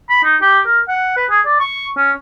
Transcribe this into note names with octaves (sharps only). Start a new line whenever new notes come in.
B5
D#4
G4
A#4
F#5
B4
G#4
D5
C#6
C#4